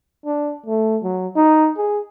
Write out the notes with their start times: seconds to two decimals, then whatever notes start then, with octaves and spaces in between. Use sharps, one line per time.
0.25 D4
0.66 A3
1.03 F#3
1.36 D#4
1.78 G#4